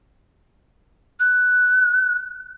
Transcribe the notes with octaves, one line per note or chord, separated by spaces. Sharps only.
F#6